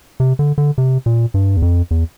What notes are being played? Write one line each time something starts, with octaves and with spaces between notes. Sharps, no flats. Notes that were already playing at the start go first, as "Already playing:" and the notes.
C3
D3
D3
C3
A#2
G2
E2
F2
E2